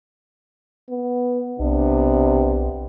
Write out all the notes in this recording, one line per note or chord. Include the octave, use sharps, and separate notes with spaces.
B3
B1 C3 B3 D4